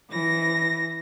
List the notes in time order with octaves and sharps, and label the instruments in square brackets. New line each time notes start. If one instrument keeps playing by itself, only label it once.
[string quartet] E3 A#6